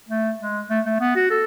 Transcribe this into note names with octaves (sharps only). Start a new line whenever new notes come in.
A3
G#3
A3
A3
B3
F#4
A4